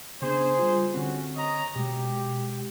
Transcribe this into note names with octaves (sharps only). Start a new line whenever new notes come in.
C#3 B3 D4 G#4 C5
G3 F4
D3 C4 C#4 F#4
C#5 D#5 A#5
B2 G#3 G4